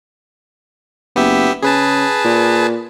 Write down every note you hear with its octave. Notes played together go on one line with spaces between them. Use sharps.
F#1 B3 G4 E5
C#3 G#4 B4 A5
A#2